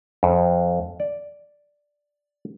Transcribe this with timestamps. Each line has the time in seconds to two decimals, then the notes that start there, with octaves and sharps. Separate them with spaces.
0.23 F2
1.00 D5